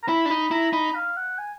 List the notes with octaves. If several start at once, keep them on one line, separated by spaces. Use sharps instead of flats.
A#5
E4 B5
D4
D#4 B5
E4 A#5
D#4 B5
F5
F#5
G#5